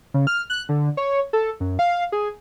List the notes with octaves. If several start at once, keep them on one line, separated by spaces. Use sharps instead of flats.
C#3
F6
F#6
D3
C#5
A4
F#2
F5
G#4